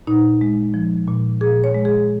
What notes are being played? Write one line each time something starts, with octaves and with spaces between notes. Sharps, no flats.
A#2 D#4
G#3
F3
A#2
A#2 G#4
C#5
G#3
G#4